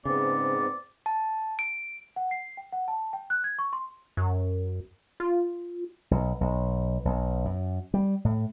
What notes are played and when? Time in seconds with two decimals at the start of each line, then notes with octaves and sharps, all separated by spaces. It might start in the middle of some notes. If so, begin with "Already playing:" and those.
0.05 G#2 C#3 B3 C4 D5
1.06 A5
1.59 D7
2.16 F#5
2.31 C7
2.57 G5
2.73 F#5
2.88 A5
3.13 G5
3.30 F#6
3.44 G#6
3.59 C#6
3.73 C6
4.17 F#2
5.20 F4
6.11 B1
6.41 B1
7.05 B1
7.45 F#2
7.94 G3
8.25 A2